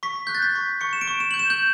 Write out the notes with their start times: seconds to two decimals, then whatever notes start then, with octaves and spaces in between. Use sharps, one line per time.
0.03 C#6 B6
0.27 F#6 G6
0.35 A6
0.42 B6
0.55 C#6
0.81 C#6 C#7
0.93 E7
1.01 D7
1.08 C#6
1.20 E7
1.31 G6 F#7
1.39 E7
1.50 G6